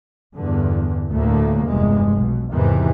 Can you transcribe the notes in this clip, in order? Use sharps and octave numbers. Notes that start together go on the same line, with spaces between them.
E2 G2 D3
D2 A2 D3 A3 A#3
F1 E2 G2 G#3
B1 B2
E2 G#2 C3 D#3 E3